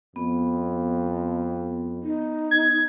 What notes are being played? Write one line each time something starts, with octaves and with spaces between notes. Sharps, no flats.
F2 B3
D#4
G#6